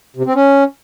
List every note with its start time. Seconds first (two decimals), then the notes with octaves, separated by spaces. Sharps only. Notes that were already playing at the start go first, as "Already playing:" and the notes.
0.17 C3
0.26 C4
0.35 C#4